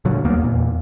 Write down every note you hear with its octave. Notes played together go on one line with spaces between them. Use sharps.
A#2 D3 F#3
D1 E2 A#3 B3
E2 A#2